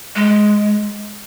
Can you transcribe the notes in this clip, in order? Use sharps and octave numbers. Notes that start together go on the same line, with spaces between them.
G#3